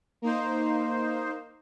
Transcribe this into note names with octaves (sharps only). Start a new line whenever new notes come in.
A#3 D#4 C5